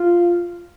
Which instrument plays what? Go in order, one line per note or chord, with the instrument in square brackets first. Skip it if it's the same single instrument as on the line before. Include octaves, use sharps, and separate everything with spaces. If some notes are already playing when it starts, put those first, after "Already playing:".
Already playing: [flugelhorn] F4